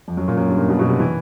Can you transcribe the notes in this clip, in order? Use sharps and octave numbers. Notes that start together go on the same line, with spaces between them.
F2
F#2
A#2
F#2
G2
A#2
B2
B2
C3
E3